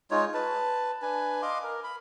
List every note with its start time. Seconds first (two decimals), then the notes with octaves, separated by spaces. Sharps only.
0.11 G#3 D#4 F4 C#5
0.34 B4 A5
1.02 D4 B4 G#5
1.42 D#5 F5 C6 D6
1.63 A#4
1.84 B5